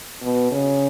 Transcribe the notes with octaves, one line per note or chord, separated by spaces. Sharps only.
B2
C#3